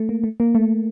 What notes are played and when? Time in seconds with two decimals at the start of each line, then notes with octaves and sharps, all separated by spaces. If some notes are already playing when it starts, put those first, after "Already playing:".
Already playing: A3
0.09 A#3
0.24 A3
0.40 A#3
0.55 A3